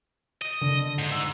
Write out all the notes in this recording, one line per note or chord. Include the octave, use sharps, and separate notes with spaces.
D#5
D3
G#2
E6